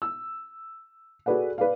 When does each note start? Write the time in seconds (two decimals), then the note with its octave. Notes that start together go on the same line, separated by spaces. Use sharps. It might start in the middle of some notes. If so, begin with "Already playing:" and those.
0.02 E6
1.26 F#4 G#4 A4 B4 D5 F#5
1.58 B4 D5 F5